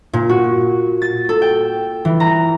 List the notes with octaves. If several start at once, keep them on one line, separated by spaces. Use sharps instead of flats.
A#2
F#4
A6
A4
G5
E3
A#5